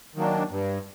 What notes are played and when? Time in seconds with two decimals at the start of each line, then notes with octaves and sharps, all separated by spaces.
0.15 D#3 F#3 A#3 D4
0.50 G2